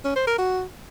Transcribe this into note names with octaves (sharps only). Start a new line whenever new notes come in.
C#4
C5
A#4
F#4